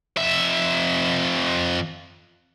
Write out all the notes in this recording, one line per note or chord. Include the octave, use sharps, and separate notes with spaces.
F2 E5